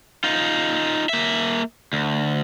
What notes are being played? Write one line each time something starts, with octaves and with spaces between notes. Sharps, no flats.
D#4 F4
A#3 E5
D2